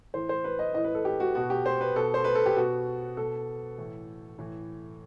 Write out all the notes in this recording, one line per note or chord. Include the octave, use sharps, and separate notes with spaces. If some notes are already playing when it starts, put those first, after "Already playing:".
A2 E3 C5
C5
B4
D#5
A2 E3 D#5
B4
A4
G4
F#4
B2 F#4
G4
C5
B4
B2 A4
C5
B4
A4
G4
B2 F#4
B2 A4
A2 E3
A2 E3